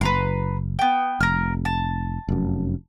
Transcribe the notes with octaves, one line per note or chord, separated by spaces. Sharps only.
F#1 B4 A#5 C6
B3 G5
F1 A#4 F6
A5
F1 F#2